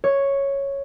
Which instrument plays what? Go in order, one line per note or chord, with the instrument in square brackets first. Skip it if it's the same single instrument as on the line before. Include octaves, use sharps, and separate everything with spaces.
[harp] C#5